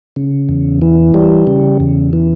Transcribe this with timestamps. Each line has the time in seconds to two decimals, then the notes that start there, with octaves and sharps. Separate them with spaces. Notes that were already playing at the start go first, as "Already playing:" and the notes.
0.16 C#3
0.49 E2
0.82 E3
1.14 G3
1.47 C#3
1.80 E2
2.13 E3